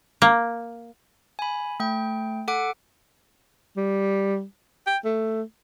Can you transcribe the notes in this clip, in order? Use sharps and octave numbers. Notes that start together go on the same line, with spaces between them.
A#3
G#5 B5
A3 G5
A4 F#5 D6 D7
G3
G5
A3